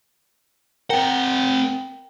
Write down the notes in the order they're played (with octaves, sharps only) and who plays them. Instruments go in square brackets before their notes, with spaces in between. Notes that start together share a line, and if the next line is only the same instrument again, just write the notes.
[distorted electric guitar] C4 F#5 [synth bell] A#4 G5